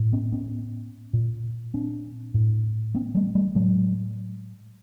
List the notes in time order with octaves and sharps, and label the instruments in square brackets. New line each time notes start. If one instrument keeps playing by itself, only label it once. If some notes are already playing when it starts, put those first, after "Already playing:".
Already playing: [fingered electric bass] A2
B3 C#4
B3 C#4
A#2
C4 D4
A2
B3 C#4
G3 A3
G3 A3
A2 F#3 G#3